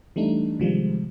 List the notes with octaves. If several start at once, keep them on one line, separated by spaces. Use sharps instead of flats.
E3 G3 A3 D4 D#4
C3 D#3 F3 G3 G#3